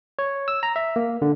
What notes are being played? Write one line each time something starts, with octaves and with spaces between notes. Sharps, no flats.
C#5
E6
A#5
E5
A#3
D3